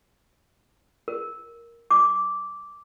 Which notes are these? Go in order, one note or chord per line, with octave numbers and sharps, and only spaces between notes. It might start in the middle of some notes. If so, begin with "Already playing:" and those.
A#4
D6